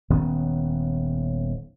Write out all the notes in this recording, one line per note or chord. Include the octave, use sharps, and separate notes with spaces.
D#1 D#3 B3 C#4